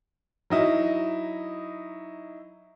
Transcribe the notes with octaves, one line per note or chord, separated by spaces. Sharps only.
F#3 D#4 E4